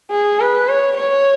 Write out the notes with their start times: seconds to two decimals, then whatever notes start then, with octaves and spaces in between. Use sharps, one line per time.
0.11 G#4
0.40 B4
0.68 C#5
0.97 C#5